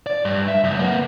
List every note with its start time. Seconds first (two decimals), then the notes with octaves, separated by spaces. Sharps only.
0.06 D5
0.25 G2
0.48 E5
0.64 C#2 F#2
0.79 A#3 B3